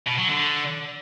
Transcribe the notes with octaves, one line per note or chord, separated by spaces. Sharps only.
B2
F#3
D3